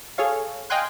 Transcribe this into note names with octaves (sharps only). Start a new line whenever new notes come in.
G#4 A4 C#5 F5
D#5 F5 G5 G#5 C6 F#6